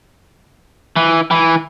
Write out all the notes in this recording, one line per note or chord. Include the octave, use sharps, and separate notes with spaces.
E3
E3